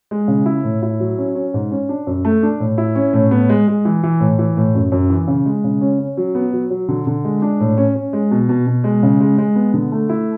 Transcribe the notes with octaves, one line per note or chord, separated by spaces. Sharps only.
G#3
C#3
E4
A2
E4
F#3
C#4
C#4
G#2
C#4
D4
F#2
A3
D4
A2
E4
C#4
A2
B3
G#3
G#3
E3
E3
A2
E3
A2
F#2
F#2
E3
C#3
G#3
C#3
C#4
C#4
F#3
B3
F#3
F#3
D3
D3
G#3
D4
A2
C#4
C#4
G#3
B2
B2
B2
G#3
C#3
G#3
G#3
B3
D3
A3
E4